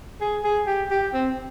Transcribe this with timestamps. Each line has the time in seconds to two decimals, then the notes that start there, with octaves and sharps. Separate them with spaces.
0.21 G#4
0.44 G#4
0.67 G4
0.91 G4
1.13 C4